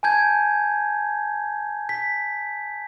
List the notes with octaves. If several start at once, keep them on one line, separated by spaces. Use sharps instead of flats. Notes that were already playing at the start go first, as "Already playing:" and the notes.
G#5 A5 G6 G#6
B6